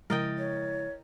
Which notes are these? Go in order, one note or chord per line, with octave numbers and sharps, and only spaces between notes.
C#3 F3 G#3 E4 A#4 D#5 G5 A6
C#5